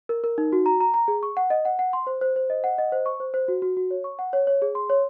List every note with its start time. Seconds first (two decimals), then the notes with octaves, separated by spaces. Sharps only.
0.09 A#4
0.24 A#4
0.38 D#4
0.53 F#4
0.66 A#5
0.80 A#5
0.94 A#5
1.08 G#4
1.23 C#6
1.37 F#5
1.50 D#5
1.65 F#5
1.79 F#5
1.93 C6
2.07 C5
2.21 C5
2.36 C5
2.50 D#5
2.64 F#5
2.78 D#5
2.92 C5
3.06 C#6
3.20 C5
3.34 C5
3.48 F#4
3.62 F#4
3.77 F#4
3.91 C#5
4.04 C#6
4.19 F#5
4.33 C#5
4.47 C#5
4.62 G#4
4.75 C6
4.90 C#5